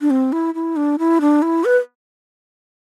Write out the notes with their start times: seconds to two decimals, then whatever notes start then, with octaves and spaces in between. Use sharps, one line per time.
0.01 D4
0.10 C4
0.32 E4
0.54 E4
0.76 D4
0.99 E4
1.21 D4
1.42 E4
1.64 B4